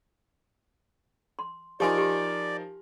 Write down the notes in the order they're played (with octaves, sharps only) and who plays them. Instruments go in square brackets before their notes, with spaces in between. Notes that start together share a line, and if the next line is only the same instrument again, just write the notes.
[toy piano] C6
[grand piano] F3 D#4 A#4 [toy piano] G4 G#5 C6 [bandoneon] D5
[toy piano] G4 C6